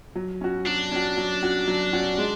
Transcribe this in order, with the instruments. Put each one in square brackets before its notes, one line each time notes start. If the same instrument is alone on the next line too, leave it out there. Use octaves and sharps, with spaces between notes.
[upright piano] F#3
C#4 F#4
[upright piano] F#3 [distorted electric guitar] D4
[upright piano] C#4 F#4
F#3
C#4 F#4
F#3
C#4 F#4
G#3